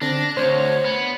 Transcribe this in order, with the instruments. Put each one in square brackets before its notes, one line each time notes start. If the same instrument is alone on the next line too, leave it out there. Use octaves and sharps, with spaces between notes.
[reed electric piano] D3 C4 [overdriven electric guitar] D4 [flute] A#6
[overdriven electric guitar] D2 [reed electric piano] C5 [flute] C#5
[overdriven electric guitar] B3